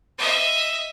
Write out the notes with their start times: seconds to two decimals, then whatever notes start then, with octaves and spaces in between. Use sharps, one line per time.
0.18 D#5 E5